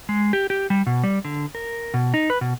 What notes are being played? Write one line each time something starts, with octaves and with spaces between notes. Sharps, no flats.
G#3
G4
G4
G3
B2
G3
D3
A#4
B2
D#4
B4
B2